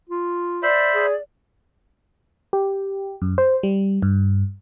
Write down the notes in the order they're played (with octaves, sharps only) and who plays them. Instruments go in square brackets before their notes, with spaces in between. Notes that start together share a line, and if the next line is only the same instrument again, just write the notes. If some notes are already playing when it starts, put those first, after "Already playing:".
[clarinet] F4
[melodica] C5 E5 B5 [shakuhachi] D5
[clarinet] G#4
[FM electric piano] G4
F#2
C5
G3
G2